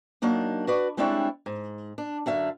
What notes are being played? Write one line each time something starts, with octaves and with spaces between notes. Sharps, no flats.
F#3 A#3 D4 D#4
F#4 B4 D5
G3 G#3 C4 D4 E4 C#5
G#2
D4
F#2 D3 E5 F5